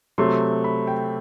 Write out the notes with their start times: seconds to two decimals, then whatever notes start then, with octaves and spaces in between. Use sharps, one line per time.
0.18 C3 F#3 A3 C6
0.64 B5
0.87 G5